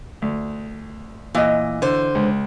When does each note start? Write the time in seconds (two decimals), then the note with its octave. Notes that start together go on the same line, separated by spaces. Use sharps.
0.22 D2
1.35 A#2 E3 D#5
1.82 D3 C5
2.15 C#2